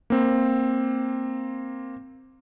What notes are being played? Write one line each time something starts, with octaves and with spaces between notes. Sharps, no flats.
A#3 C4